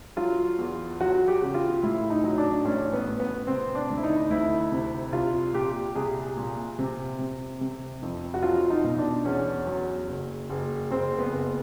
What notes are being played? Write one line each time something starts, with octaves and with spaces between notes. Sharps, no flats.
F#3 F4
E2
F#3 F#4
G4
C#3
F4
A2 E4
D#4
F#3
D4
A1 C#4
B3
A1
B3
C3 C4
D4
D2
E4
D#4
D2 E4
C3
C2 F4
A#2 G4
C2 G#4
A#2
C3
C3
C3
F2
F#4
F#3 F4
D#4
B2
D4
E2 C#4
F#3
F#1
F#1
F#1 C4
B3
F#1